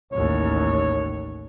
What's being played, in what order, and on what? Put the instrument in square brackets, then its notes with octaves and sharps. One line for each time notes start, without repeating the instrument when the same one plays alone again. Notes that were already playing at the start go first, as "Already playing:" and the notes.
[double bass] A1 D#2 [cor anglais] C#5